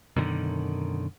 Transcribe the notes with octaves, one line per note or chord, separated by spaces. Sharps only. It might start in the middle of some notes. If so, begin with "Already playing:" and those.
F#2 B2 D3 D#3